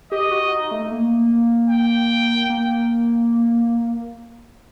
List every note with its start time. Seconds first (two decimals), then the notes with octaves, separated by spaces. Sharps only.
0.12 G4 D#5
0.31 F#4
0.42 F#4
0.52 D#4
0.71 A3
0.91 A#3
1.70 G5
2.50 A#3